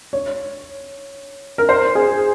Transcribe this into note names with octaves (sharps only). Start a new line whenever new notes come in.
C#5
A#4
C5
G#4